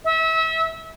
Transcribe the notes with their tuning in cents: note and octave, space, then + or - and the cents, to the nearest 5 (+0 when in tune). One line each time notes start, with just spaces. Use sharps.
E5 -30